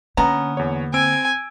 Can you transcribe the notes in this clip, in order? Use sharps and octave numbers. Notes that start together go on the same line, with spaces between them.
D3 A#3 B3 C#4 A#5
E2 C#5
C4 G#5 E6 D7